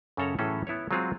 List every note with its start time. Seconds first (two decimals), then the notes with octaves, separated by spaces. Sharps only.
0.17 F#2 C#3 C#4 A4 C#5 A#5
0.39 A2 E3 F#3 C#4 G#4 A4
0.67 B3 E4 B4 C#5
0.91 F#3 G#3 C4 F4 F#4 G#4